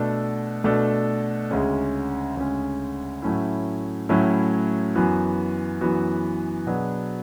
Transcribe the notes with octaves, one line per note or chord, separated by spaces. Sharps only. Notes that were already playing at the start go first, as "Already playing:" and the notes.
Already playing: B2 A3 D4 A4
B2 A3 D4 A4
D2 C#3 G#3 C#4
D2 C#3 G#3 C#4
A2 F#3 A3 C#4 E4
A2 F#3 A3 C#4 E4
F#2 E3 B3 F#4
F#2 E3 B3 F#4
B2 F#3 B3 D4 G#4